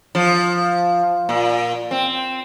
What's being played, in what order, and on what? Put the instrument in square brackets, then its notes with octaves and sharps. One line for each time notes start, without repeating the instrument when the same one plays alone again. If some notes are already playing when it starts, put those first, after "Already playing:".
[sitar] F3
A#2
C4